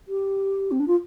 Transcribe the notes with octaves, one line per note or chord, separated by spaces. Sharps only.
G4
C4
D4
F4